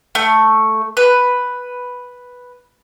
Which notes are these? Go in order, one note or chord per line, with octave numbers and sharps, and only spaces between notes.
A3
B4